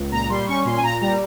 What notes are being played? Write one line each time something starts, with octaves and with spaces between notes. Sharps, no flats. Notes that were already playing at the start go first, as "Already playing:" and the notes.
Already playing: C#2
A#2 A#5
G3 C6
C#4 C#6
A#2 C6
G#5
A#2 A#5
G3 A#5